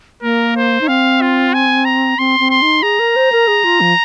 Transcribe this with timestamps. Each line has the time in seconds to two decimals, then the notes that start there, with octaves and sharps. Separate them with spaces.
0.23 A#3 A#4
0.56 C5
0.81 D#4
0.88 C4 F5
1.21 F4
1.54 G#5
1.85 A#5
2.18 C4 C6
2.40 C4
2.50 C6
2.62 D#4
2.83 G#4 A#5
2.99 A#4
3.16 C5
3.32 A#4
3.48 G#4
3.64 F4
3.81 F3